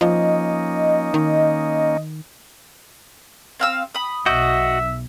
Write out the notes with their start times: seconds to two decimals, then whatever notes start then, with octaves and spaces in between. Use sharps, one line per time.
0.01 F3 A#3 C#4 D#4 D#5
1.14 D#3
3.60 C4 F5 E6
3.95 B5 D#6
4.26 B1 F#4 D#5 E5 G6